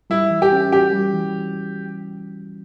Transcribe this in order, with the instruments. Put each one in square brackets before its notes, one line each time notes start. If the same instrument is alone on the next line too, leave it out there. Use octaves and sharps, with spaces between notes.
[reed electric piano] G3 [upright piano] E4
[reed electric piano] E3
[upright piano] G4
[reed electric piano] C#4
[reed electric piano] F#4 [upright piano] G4
[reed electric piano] G3
E3